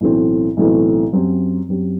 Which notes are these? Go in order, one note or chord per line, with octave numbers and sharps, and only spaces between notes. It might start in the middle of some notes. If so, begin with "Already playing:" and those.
B1 A2 E3 A3 C4
B1 A2 E3 A3 C4
F#2 F#3 C4 G4
F#2 F#3 C4 G4